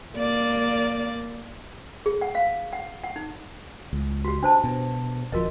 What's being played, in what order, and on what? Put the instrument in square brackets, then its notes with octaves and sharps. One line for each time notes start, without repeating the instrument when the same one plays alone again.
[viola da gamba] A#3 D5
[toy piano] G#4
F#5
F5
F#5
F#5
D#4
[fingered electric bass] C#2
[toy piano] F#4 G4
D4 C5 A5
[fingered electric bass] B2
[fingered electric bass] D#1 F3 [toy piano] F#4 A#4 D#5